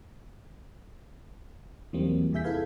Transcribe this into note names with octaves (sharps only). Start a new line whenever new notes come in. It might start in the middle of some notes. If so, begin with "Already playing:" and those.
E2 E3 F#3 G3 A#3 C4
E2 C3 G#4 E5 G6 B6
E4 G#4 A4 B4 F5 G#6